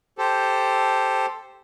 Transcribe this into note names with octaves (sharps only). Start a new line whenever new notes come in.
G4 A4 C5